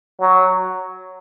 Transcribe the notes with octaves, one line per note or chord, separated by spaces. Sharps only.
F#3